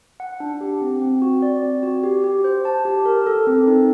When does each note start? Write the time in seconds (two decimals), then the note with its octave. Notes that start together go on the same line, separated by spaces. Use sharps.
0.20 F#5
0.40 D4
0.61 G4
0.81 C4
1.01 C4
1.22 F#4
1.42 D5
1.63 C4
1.83 F#4
2.04 G4
2.24 G4
2.44 C5
2.65 A5
2.85 G4
3.06 A#4
3.26 A4
3.47 C4
3.67 D#4